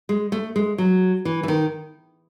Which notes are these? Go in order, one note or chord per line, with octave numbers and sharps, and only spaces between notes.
G#3
A3
G#3
F#3
E3
E3
D#3